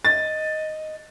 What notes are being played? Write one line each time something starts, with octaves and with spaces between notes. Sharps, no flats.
D#5 A6